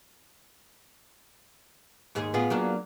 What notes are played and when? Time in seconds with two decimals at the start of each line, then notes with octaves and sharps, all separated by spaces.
2.15 D#2 G#2 G#4
2.34 A2 B3 F4 G#4
2.50 F#3 A#3 D4